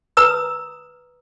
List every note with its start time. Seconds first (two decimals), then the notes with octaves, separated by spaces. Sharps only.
0.17 B4 A#5 D#6 E6